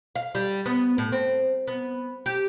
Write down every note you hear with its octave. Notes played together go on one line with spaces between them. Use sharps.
F5
G3
B3
A2
C4
B3
G4